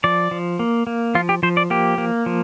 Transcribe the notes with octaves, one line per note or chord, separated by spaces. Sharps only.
F3 D5
F3
A#3
A#3
F3 F4
G4
F3 C5
D5
A#3 G4
A#3
F3